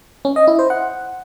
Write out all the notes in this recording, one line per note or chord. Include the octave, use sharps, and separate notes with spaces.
C#4
D#5
E4
C5
F#5